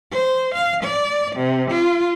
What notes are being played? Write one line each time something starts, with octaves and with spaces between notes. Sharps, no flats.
C5
F5
D5
C3
F4